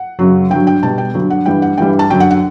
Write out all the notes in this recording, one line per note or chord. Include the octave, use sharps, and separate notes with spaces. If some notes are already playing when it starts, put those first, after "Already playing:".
Already playing: F#5
F#2 C#3 F#3
G2 D3 F#3 G5
G5
B2 G3 A5
G5
G2 D3 F#3
F#5
G2 E3 G3 G5
F#5
G2 E3 G3 G5
A5
F#2 D3 F#3 G5
F#5
F#5